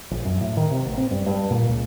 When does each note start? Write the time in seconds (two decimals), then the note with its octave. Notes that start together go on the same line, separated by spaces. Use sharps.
0.11 A#1
0.25 F#2
0.41 A2
0.57 D#3
0.71 C3
0.85 A1
0.97 C4
1.11 G2
1.26 G2
1.50 A#2
1.69 C#2